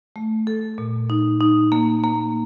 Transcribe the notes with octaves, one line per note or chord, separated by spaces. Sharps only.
A3
A4
A#2
D#4
D#4
A#3
A#3